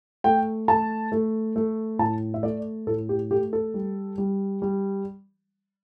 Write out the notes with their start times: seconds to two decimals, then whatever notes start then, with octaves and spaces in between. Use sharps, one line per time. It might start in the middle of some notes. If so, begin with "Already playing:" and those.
0.24 A3 G5
0.68 A3 A5
1.12 A3
1.56 A3
1.99 A2 A5
2.34 E5
2.43 A3 D5
2.87 A2 A4
3.09 G4
3.31 A3 G4
3.53 A4
3.74 G3
4.18 G3
4.62 G3